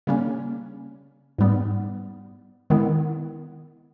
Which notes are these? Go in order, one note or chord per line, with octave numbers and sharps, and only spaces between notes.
C#3 G3 A#3 C#4
G#2 G3 B3
D#3 G#3 B3 E4